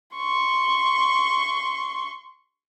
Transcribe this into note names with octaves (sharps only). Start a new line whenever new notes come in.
C6 C#6